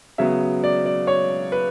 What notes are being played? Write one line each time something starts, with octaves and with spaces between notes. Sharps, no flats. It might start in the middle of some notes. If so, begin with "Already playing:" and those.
C#3 F#3 B3 E5
D5
D5
C#5
B4